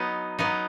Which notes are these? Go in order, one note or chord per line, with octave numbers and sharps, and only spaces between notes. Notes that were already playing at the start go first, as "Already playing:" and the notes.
Already playing: F#3 B3 D#4
F#3 B3 D#4